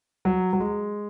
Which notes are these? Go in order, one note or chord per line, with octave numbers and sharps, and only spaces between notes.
F#3
F#3
G#3